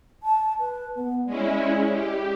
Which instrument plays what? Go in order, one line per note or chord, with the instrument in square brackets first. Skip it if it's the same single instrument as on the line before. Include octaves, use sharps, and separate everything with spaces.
[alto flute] A5
B4
B3
[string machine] G#3 C#4 E4 [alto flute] D5
[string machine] G4